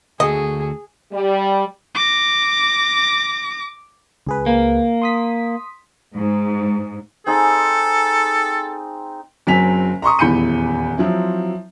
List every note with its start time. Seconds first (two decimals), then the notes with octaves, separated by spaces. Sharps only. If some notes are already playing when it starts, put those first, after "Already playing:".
0.20 D2 F#4 G#4 A4 D#5
1.12 G3
1.95 D6 A#6
4.27 C#2 G#4 B4
4.46 A#3
5.02 C6 D#6 B6
6.15 G#2
7.26 C4 D#4 G#4 A4
9.47 F#1 F#3 C4 G#5 B6 F7
10.02 A#5 C6 C#6 D#6
10.19 D#1 E2 B5 G6 C#7 D#7
10.97 F3 F#3 C4 E4